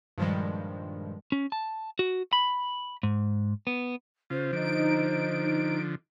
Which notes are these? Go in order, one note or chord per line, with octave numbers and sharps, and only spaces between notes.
G2 A#2 D#3 F3 G3 G#3
C#4
A5
F#4
B5
G#2
B3
C#3 F4 C5
D3 F3 D#4 D7